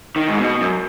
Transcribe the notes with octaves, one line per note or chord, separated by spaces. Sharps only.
D#3
G#2
B2
F#2